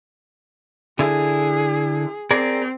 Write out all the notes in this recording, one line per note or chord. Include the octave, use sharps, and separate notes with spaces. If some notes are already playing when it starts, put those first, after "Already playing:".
D3 E4 G#4
C4 G#4 A#4 D5